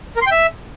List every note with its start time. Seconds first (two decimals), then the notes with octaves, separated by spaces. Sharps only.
0.16 A#4
0.21 C6
0.26 G5
0.31 E5